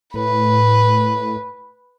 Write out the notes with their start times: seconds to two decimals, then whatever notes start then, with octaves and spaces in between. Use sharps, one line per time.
0.14 A2 B4